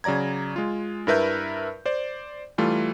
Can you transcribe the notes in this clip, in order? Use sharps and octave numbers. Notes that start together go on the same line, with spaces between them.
C#3 F#3 D5 A#5 G#6
G#3 F4
G2 E4 A#4 B4 E5 G6
C5 D5
E3 G3 A3 F4